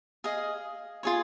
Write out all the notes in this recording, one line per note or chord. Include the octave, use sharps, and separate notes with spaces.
G#4 D#5 F5
F4 G#4 C#5